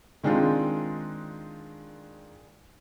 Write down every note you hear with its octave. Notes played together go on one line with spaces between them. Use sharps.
D#3 G#3 C4 D4 D#4 F4